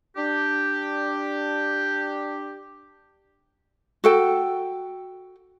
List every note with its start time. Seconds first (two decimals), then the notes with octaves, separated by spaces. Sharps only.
0.17 D4 G4
4.04 F#4 A4 G5